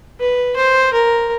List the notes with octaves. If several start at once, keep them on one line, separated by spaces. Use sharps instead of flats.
B4
C5
A#4